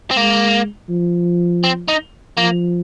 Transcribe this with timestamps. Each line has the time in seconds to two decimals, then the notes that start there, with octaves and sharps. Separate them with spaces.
0.11 C4
0.16 G#3 A#3
0.89 F3
1.64 C4
1.88 D#4
2.37 F3 A#3